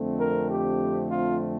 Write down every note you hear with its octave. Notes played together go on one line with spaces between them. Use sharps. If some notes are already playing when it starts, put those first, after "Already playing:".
Already playing: F2 D3 A3 C4
A#4
G4
F4